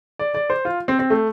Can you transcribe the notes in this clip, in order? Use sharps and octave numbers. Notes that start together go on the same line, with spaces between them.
D5
D5
C5
F4
C4
C4
A3